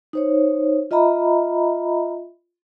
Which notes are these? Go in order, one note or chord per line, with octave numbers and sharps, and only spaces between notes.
D#4 C5 C#5
F4 D#5 E5 A#5 B5